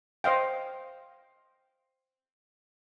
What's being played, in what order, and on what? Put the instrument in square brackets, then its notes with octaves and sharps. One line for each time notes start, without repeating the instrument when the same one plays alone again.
[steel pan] C5 D#5 F5 G5